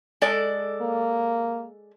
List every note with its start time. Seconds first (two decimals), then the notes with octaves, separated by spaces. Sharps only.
0.22 G#3 A4 D5
0.81 A#3